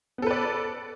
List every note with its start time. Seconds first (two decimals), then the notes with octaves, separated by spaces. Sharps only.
0.18 B3
0.22 A4
0.27 B4
0.31 D5